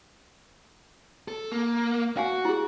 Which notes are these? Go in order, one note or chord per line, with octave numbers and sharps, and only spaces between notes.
A4
A#3
F#4 F5 F#5 G#5
E4 G#4